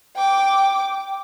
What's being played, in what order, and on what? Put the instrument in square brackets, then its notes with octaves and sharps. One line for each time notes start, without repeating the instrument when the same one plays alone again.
[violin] G5 D6